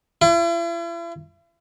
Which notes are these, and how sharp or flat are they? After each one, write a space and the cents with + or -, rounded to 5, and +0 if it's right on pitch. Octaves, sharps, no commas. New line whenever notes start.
E4 +45